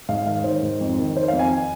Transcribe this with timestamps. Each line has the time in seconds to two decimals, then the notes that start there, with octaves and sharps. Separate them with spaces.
0.09 G#2 F5
0.26 D#3 F5
0.44 D#3 C5
0.63 G#2
0.81 F2
0.99 D#3
1.16 D#3 C5
1.28 F2 F5
1.39 G#5